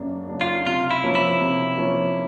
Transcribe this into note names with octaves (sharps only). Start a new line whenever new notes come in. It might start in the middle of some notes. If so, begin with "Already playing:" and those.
Already playing: F#2 C#3 F#3 A#3 D4
C#3 F#3 A#3 D4
F4
C3 F4
E4
F3 A#3 C#4
E4
C3
F3 A#3 C#4